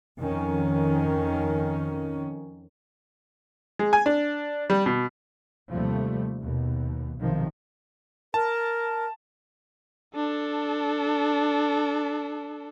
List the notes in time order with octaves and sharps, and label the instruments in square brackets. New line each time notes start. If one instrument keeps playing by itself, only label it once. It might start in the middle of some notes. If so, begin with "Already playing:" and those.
[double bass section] F2 D#3 C#4
[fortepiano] G#3
G#5
D4
G3
B2
[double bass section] D#2 C3 F3 G3 A3
D#2 B2
B1 C3 D#3 F3
[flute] A#4 [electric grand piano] A5
[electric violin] D4 A4